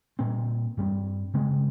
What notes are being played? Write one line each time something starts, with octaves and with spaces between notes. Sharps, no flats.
A#2 G3 C4
G2 G3 C4
C#3 G#3 C4